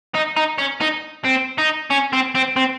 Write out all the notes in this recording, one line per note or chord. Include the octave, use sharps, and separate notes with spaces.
D#4
D#4
C#4
D#4
C4
D#4
C#4
C4
C4
C4